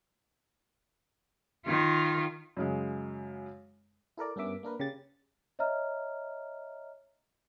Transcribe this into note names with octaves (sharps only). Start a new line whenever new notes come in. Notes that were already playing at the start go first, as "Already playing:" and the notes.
D#3 F4
F#2 C#3 G#3
E4 A4 A#4 D5
G2 B3 C#4 A#4 E5 D6
A#3 D4 A#4 B4
C#3 G4 A6
C#5 D#5 E5 A#5 F6